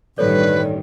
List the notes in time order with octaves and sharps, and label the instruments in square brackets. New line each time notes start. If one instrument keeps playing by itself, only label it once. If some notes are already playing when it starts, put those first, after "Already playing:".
[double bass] A1 D#3 [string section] G2 [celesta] A4 C#5 D5 [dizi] B4